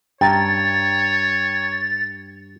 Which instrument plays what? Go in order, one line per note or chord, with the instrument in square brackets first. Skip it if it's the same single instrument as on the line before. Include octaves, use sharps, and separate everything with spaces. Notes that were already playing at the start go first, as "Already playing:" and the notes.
[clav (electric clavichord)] G2 [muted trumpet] C#5 [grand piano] G5 A#5 [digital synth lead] A6